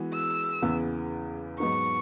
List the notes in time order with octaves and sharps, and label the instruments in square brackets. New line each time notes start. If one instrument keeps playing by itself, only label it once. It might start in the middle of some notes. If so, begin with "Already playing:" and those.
Already playing: [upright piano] E3 G#3 B3 F#4
[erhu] E6
[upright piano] E2 C#3 E3 B3
[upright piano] G#2 F#3 B3 D#4 [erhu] C#6